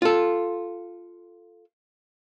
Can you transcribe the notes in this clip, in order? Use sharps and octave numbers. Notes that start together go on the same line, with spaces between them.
F4 A4